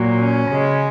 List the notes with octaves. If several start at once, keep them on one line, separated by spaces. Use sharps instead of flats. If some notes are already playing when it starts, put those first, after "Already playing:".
Already playing: A#2 F#3
C#4
C#3 G#3